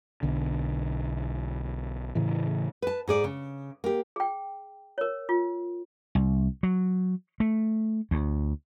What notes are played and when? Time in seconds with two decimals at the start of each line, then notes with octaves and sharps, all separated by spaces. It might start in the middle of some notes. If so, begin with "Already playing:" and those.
0.23 B1 D3
2.15 A2 C#3 E3
2.82 B4 A5
3.08 G#2 G#4 D5
3.24 C#3
3.84 A#3 G4
4.16 G#4 G5
4.98 A#4 C#5
5.29 F4
6.15 C2
6.63 F#3
7.40 A3
8.11 D2